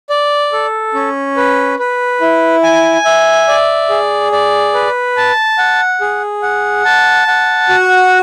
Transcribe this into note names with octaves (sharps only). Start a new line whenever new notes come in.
D5
A4
C#4
B4
B4
E4
G#5
E5
D5
G#4
D5
B4
A5
F#5
G#4
F#5
A5
F#5
F#4